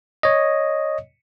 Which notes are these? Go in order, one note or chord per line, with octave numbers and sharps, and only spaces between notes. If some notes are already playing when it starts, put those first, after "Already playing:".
C#5 D#5